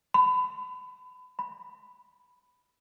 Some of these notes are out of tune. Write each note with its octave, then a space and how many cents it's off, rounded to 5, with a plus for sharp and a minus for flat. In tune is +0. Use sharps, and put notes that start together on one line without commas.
B5 +30
B5 +5